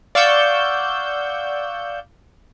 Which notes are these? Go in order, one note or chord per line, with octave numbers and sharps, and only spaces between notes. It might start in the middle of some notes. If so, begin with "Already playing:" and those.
D5 F5 F#5 C#6 E6 G6